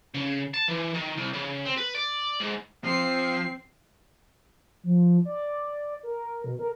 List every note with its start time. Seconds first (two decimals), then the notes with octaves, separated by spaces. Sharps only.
0.14 C#3
0.54 A5
0.68 E3
0.94 D#3
1.16 C2
1.33 C#3
1.65 C4
1.77 B4
1.94 D5
2.40 G#2
2.84 F3 C4 C7
4.83 F3
5.25 D5
6.03 A#4
6.44 B2
6.59 A#4